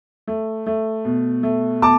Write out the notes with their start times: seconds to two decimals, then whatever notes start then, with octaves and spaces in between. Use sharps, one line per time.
0.28 A3
0.67 A3
1.05 B2
1.43 A3
1.81 B2 A5 D6